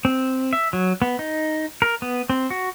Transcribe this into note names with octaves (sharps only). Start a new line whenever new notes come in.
C4
E5
F#3
B3
D#4
A#4
B3
C4
F#4